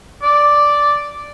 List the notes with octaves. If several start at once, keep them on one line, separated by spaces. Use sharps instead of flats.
D5